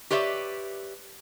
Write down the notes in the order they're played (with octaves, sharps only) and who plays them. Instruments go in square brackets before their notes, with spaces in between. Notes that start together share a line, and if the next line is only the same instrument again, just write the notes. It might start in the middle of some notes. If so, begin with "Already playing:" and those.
[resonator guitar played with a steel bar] G4 B4 C#5 D5 E5